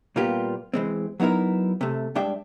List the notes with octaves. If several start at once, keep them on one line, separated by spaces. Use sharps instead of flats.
A#2 G3 A#3 B3 F4 G4
E3 G#3 C4
F#3 B3 D#4 E4 A#4
C3 A3
G2 G#3 D4 E5 G5